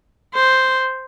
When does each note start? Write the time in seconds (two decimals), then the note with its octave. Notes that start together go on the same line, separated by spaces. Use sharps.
0.35 C5